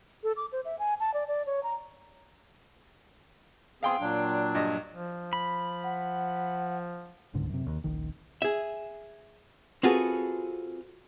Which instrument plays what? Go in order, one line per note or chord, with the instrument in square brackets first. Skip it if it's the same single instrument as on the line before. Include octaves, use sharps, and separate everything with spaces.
[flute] A4
D6
C5
E5
G#5
A5
D5
D5
C#5
A#5
[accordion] B3 C4 G#4 [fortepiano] F5 G5 C6
[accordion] A#2 F#3 D4
[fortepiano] G2 D#5
[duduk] F3
[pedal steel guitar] B5
[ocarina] F#5
[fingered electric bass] D1 C#2 G#2 D3
F#2 C3
D#2
D#1 A#1 D#3
[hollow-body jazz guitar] G#4 E5
C4 F4 F#4 G#4 A4 B4